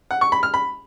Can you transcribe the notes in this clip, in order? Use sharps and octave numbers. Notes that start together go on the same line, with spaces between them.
F#5
C#6
B5
F6
B5